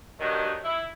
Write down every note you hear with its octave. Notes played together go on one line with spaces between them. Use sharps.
G2 D#3 F#3
E4